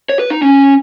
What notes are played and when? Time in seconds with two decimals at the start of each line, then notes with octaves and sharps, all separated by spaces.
0.09 C#5
0.19 B4
0.30 D#4
0.42 C#4